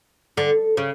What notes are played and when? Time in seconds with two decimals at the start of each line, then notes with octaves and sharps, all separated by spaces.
0.37 D3
0.77 C#3